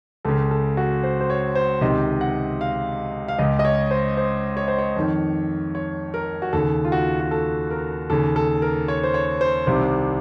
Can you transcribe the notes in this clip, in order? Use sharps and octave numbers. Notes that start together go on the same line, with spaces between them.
C#2 C#3 A4
A4
F#4
C5
C5
C#5
C5
C#2 C3 D#3 D#5
F#5
F5
F5
C#2 C#3 D#5
D#5
C#5
C5
C5
C#5
C5
C#5
F2 D#3
C#5
A#4
F#4
D#2 C#3 A4
F4
F#4
F#4
A4
A#4
D#2 C#3 A4
A4
A#4
C#5
C5
C#5
C5
C2 C3 D#3 C5